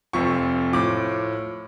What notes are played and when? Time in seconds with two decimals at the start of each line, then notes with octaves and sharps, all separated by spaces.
0.13 F1 F2 F3 C#6
0.72 A2 F3 D6